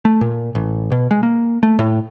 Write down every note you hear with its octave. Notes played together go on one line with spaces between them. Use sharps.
A3
A#2
A1
B2
G#3
A#3
A3
A2